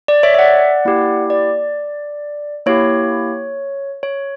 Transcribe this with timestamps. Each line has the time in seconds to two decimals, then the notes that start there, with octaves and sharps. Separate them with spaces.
0.08 D5
0.23 C#5 E5
0.34 E5
0.39 D5 F#5
0.85 A#3 E4 G4
1.30 D5
2.66 A#3 E4 G4 C#5
4.03 C#5